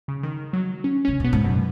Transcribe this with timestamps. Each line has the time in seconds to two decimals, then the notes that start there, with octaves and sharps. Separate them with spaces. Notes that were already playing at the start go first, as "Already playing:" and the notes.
0.08 C#3
0.23 D#3
0.53 F#3
0.84 C#4
1.05 C#3 C#4
1.20 B2 B3
1.33 G#2
1.44 F#2 B2